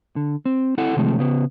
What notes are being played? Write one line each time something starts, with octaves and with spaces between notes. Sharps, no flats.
D3
C4
C4 E4 A4 F#5
C3 D#3 F3 G#3 A3 C4
C#3 B3